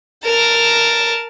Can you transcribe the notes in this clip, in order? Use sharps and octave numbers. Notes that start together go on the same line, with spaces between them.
A#4 A5